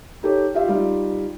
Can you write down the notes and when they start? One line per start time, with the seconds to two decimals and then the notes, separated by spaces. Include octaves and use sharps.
0.23 D#4 G4 A4 C#5
0.55 F4 G4 E5 F5
0.68 G3 D#4 F4